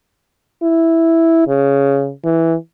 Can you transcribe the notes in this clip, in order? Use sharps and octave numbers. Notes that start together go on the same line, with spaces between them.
E4
C#3
E3